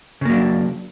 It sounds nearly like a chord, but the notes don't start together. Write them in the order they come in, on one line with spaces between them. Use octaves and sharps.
C#3 A#3 F#3 D4